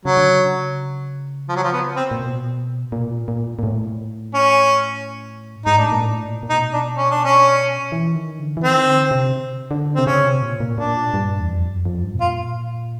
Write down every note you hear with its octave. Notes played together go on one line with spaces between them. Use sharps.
C#3 F#3
D3
C#3
F3
F#3
F3
B3
C4
A#2
B2
A#2
A#2
A#2
A2
C#4
G#2 D#4
A2 D4
A#2
A2
A#2
A#2
B2 D#4
D4
C#4
D4
C#4
E3
D#3
D3
E3
D#3 C4
D3
C3
D3
C3 C4
C#3 C#4
C3
A#2
A#2
A#2 D4
G2
E2
F2
F#2
F2
G2
B2
A#2 F4